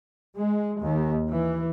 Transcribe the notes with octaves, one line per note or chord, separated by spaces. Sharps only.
G#3
D#2
E3